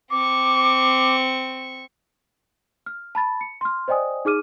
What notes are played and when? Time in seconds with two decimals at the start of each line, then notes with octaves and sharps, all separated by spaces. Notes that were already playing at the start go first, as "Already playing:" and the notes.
0.11 C4 C#6 D6
2.86 F6
3.15 A5 B5 A6
3.41 C#7
3.61 C6 F6
3.88 C5 D5 D#5 G5 G#5 D#6
4.25 D#4 G#4 D6 F6 D#7